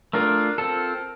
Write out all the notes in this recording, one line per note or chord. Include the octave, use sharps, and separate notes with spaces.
A3 D4 F4 A#4
C4 F4 A4